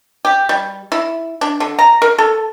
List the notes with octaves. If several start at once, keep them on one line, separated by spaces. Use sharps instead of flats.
G4
G3
E4
D4
D3
A#5
A#4
A4